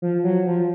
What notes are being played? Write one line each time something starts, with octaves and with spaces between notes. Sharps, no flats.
F3
F#3
F3